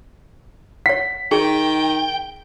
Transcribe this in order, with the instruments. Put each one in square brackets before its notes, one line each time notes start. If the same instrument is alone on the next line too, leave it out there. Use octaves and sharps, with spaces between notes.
[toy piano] C#5 F#5 [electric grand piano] B6
[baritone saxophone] D#3 [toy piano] G#4 [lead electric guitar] G5